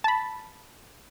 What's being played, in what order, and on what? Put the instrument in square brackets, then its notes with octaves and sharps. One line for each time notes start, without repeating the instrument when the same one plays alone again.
[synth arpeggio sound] A5 B5